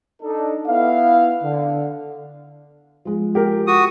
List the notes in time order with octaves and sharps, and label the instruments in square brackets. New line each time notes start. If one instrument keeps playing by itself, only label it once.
[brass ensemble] D4 D#4 A4
B3 E4 F5
D3
[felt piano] F3 G#3
[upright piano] G4 A#4
[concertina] F#4 D#6